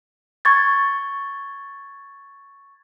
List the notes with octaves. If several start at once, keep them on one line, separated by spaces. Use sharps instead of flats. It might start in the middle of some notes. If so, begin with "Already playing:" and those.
C#6 G#6 A6